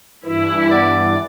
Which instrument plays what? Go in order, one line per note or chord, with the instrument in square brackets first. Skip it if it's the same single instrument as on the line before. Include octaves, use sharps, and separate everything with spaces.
[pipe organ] G2 E3 [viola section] E4 [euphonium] B4
[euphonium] B3 [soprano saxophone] D5